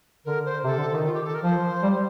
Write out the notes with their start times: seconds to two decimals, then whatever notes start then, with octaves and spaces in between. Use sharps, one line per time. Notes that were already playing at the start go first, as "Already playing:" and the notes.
0.25 D3 A#4
0.45 C5
0.65 C3 A4
0.78 D3
0.92 D#3 D#4
1.05 F4
1.14 G4
1.24 A4
1.34 A#4
1.43 F3 C5
1.83 G3